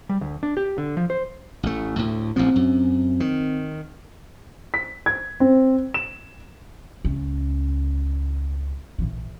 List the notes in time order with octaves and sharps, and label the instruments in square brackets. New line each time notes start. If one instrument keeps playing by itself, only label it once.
[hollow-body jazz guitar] G3
D2
D4
G4
D3
F3
C5
[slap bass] A1 A3
D2 A2
[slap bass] A1 A#2 F3 [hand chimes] C4
[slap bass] F#2
D#3
[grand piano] B6
G#6
C4
E7
[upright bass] C#2 C#4
A#1 E3